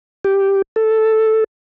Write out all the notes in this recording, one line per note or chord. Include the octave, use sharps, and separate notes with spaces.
G4
A4